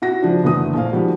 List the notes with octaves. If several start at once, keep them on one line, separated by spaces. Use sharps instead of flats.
E4 F#4 A#6
C#3 F3 D4
F#1 D3 E3 A3 D#6
A#1 C5 F5
D#3 F3 G3 F#4